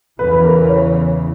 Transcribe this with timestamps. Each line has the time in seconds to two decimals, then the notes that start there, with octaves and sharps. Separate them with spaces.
0.19 E2 C#3 E3 B4
0.31 B4
0.44 A#4
0.57 B4
0.69 C#5